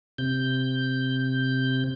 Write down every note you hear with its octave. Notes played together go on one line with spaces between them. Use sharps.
C3 G6